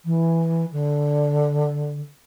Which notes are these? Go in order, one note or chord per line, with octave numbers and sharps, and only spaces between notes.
E3
D3